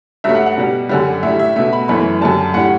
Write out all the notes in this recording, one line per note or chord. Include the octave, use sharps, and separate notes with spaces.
G2 F#3 A3 E5
F#5
F#5
B2 G3
F#2 D3 G3
A2 G3 E5
E5
B2 A3 E5
B5
F#2 E3 A3 B5
F#2 D3 G3 A5
A2 G3 F#5